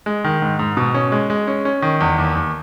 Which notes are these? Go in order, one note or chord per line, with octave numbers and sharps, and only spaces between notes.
G#3
D#3
G#2
G#2
B2
C#4
G#3
G#3
C#4
C#4
D#3
E2
D#2
D#2